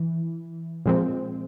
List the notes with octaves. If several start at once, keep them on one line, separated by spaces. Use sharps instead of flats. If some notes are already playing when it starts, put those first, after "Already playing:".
Already playing: E3
A#2 F3 G#3 C4